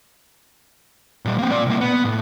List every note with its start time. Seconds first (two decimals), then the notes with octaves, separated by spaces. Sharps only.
1.25 A#2 G3
1.39 A#3 C4
1.51 A#2 D5
1.67 C2 A#3
1.81 B3
2.05 A2